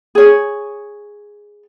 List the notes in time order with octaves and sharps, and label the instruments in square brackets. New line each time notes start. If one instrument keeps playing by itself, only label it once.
[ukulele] G#4 C#5